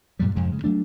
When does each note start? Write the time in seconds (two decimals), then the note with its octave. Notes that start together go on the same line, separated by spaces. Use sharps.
0.19 G2 A#2 F#3 G3
0.35 F2 G#2 C3 G#3
0.52 C#3 G#3
0.64 F#3 A3 D4